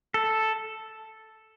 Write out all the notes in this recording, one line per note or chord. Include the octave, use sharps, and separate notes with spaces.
A4